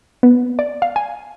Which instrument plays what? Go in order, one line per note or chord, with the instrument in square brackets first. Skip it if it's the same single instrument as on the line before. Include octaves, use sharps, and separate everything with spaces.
[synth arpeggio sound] B3
D5
F5
G#5